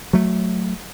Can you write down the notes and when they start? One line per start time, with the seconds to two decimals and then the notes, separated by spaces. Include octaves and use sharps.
0.13 F#3 A3